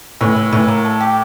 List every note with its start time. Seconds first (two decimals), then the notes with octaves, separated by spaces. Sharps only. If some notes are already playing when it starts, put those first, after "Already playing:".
0.21 A2 E3
0.36 E3
0.52 A2 E3
0.68 A#3
0.85 A3
1.01 G4